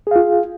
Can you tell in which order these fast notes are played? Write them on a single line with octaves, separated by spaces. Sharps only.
G#4 F5 F4